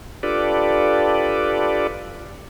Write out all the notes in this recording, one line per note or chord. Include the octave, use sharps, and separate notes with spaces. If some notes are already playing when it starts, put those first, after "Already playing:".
D4 F4 G4 A4 B4 D5